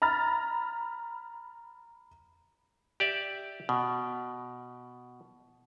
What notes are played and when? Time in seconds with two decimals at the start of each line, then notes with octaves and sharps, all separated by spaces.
0.02 A#5 B5 F6 A6
3.00 G4 D5 E5
3.69 B2